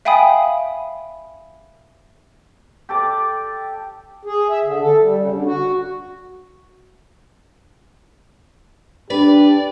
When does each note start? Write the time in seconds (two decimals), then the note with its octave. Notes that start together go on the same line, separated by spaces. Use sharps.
0.05 E5 F5 G5 G#5 B5 D#6
2.89 G4 A4 D5
4.25 G#4
4.50 E5
4.65 D3
4.80 A4
5.02 G3
5.17 C#3
5.32 D3
5.46 F#4
9.10 D4 G4 B4 D5